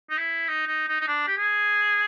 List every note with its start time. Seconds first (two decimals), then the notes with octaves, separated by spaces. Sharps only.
0.10 D#4
0.18 E4
0.48 D#4
0.67 D#4
0.88 D#4
1.01 D#4
1.08 D4
1.27 G4
1.37 G#4